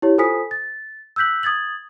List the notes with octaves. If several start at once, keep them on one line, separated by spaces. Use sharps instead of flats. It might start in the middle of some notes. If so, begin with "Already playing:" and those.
E4 G4 C#5
F4 A4 C5 G#5 D#6 B6
A6
E6 F#6 G6 B6 F#7
D#6 G#6 A6 F#7